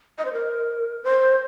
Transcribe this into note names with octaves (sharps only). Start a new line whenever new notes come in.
D#5
C5
A#4
C5